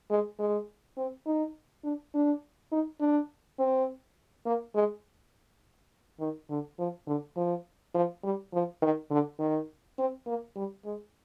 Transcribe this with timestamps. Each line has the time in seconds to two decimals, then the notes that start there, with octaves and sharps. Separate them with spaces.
0.10 G#3
0.39 G#3
0.97 C4
1.26 D#4
1.84 D4
2.14 D4
2.72 D#4
3.01 D4
3.59 C4
4.46 A#3
4.75 G#3
6.20 D#3
6.50 D3
6.79 F3
7.07 D3
7.37 F3
7.94 F3
8.24 G3
8.53 F3
8.82 D#3
9.11 D3
9.39 D#3
9.98 C4
10.27 A#3
10.56 G3
10.85 G#3